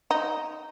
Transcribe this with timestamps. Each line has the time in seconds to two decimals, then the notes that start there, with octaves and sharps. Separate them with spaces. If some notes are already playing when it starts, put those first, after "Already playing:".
0.11 D#4